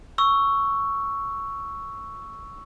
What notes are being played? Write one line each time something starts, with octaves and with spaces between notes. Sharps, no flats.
C#6 E6